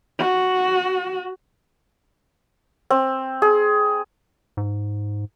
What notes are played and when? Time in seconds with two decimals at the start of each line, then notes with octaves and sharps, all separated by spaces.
0.19 F#4
2.90 C4
3.42 G#4
4.57 G#2